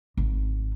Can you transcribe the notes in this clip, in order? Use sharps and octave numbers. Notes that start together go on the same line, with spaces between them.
G#1